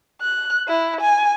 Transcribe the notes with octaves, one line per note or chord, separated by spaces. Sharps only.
F#6
E4
G#5